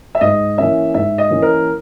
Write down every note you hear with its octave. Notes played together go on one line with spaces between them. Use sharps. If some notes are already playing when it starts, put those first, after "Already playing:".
E5
G#2 D#5
E3 A#3 C#4 E5
G#2 E5
D#5
E3 A#3 C#4
A#4